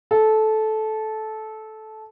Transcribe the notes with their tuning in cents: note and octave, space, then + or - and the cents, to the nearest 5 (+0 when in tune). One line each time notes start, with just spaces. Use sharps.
A4 -15